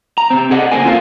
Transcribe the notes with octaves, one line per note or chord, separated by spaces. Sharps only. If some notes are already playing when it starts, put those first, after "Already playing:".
A#5
C3 C4
G#4 A4 D5 D#5 F#5
C#3 A#3 C4 G#4 A#4 G#5
F4 A4 A#4 C5 F5